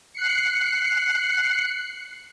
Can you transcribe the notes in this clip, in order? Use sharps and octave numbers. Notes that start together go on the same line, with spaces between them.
F#6 C7 C#7